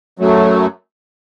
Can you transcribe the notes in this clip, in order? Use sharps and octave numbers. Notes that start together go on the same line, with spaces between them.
F#2 F#3 A3